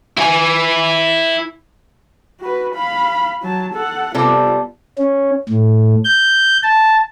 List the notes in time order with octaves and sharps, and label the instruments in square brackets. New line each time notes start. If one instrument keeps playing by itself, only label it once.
[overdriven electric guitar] E4 G#5
[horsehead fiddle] F#4 B4
F5 B5
F#3 A5
A4 F#5
[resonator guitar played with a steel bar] C3 G3 A4 [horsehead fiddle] B3 F4
[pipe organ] C#4
A2
G6
A5